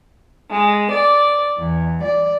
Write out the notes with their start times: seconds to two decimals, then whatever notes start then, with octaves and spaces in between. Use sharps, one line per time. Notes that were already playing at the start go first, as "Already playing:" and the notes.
0.49 G#3
0.90 D5
1.58 E2
2.03 D5